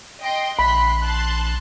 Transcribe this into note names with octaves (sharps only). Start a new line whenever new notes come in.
D#5 G5 C6
A#1 B5 C6 F#6 B6
A5 C6 F#6